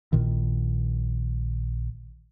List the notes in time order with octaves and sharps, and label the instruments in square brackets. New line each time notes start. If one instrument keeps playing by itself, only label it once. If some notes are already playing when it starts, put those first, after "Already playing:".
[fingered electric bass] A#1 A#2 D#3